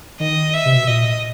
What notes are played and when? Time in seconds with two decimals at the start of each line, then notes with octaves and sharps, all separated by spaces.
0.20 D#3 D#5
0.54 E5
0.65 C3
0.76 B2
0.87 A#2 D#5